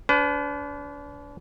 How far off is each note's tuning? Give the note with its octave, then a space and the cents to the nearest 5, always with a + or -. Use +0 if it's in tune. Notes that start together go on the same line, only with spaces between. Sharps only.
D4 -40 B4 +35